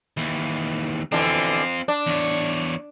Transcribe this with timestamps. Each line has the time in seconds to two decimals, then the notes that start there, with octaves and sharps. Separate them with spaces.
0.17 D#2 E3
1.12 B2 D3 E3 C4 F4
1.88 D4
2.07 E2 C#5